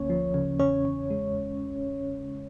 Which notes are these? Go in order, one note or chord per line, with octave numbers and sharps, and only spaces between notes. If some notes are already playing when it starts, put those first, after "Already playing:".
Already playing: D2 A#3 C#4 C#5
F3
C#3
E2 C#4 C#5
E2
G#3